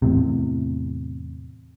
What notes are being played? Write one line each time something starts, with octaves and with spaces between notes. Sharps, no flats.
E2 A2 C3